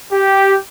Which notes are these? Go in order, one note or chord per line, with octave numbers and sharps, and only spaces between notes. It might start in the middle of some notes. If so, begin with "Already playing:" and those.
G4